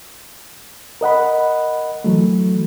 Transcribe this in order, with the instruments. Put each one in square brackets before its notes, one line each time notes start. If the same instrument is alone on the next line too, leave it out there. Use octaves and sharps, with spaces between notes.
[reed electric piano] A#4 D#5 F#5 B5
E3 F#3 A3